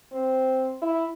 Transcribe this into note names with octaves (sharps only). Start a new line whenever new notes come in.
C4
E4